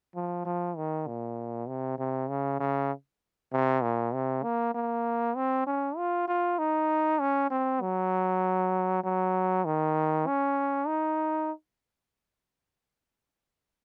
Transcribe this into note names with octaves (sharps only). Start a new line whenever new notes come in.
F3
F3
D#3
A#2
C3
C3
C#3
C#3
C3
A#2
C3
A#3
A#3
C4
C#4
F4
F4
D#4
C#4
C4
F#3
F#3
D#3
C#4
D#4